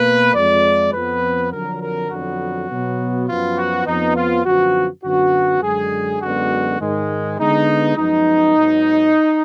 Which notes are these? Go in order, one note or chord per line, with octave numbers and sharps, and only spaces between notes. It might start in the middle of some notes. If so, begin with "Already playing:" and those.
Already playing: B2 A#3 B4
F2 F3 G#3 D5
F2 F3 B3 B4
F2 D3 F#3 A#4
A#4
F2 D3 F#3 B3 F#4
B2 F#3 B3
F#2 F3 B3 F4
F#4
F2 F3 B3 D#4
F4
F#2 D3 F3 B3 F#4
F#2 D3 F#3 B3 F#4
F#2 D3 G#3 G#4
F#2 D3 G#3 B3 F#4
G#2 D#3 G#3
D3 G#3 B3 D#4
F#2 F3 G#3 B3 D#4
G#2 F#3 B3